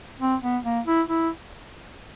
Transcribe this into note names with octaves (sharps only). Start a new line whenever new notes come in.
C4
B3
A#3
E4
E4